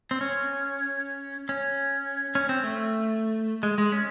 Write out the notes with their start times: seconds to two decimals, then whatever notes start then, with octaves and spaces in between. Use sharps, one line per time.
0.11 C4
0.21 C#4
1.49 C#4
2.35 C#4
2.49 C4
2.64 A3
3.63 G#3
3.78 G#3
3.92 C#4